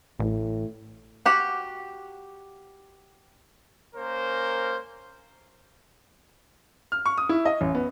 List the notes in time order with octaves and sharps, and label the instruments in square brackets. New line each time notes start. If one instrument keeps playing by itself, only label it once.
[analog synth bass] A1 [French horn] A2
[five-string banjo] F#4 G4 F#5
[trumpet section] A#3 C#4 A#4 C5
[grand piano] F6
C#6
D#6
E4
D#5
A1
B3